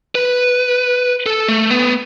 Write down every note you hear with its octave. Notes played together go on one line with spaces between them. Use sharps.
B4
A4
A3
B3